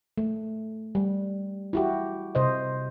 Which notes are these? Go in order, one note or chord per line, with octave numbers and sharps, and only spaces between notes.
A3
G3
E4 F#4 G4
C3 C5 D#5